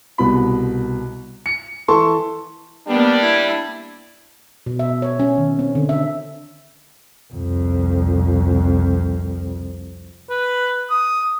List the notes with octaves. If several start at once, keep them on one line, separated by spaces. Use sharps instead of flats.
C2 B2 B5
C#7
E3 A4 A5 C6 C#6
G3 A#3 B3 D4
E4
B2
E5
C#5
C#4
D#3
C4
D3
E5
C2 F2
B4
D#6